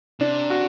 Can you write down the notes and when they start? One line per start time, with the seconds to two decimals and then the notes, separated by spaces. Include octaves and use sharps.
0.20 C3 D4
0.50 F#4